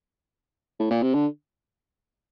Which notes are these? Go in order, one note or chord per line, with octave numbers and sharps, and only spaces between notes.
A2
A#2
C3
D3